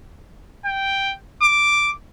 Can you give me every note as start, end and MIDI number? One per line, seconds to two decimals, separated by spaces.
0.65 1.14 79
1.42 1.91 86